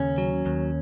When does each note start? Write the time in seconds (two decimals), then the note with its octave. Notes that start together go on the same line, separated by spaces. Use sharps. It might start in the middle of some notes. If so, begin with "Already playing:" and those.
Already playing: D#2 C#3 C#4
0.18 F#3
0.46 D#2